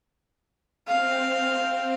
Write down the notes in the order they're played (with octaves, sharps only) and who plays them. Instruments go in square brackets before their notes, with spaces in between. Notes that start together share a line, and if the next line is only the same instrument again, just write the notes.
[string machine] C4 [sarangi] F5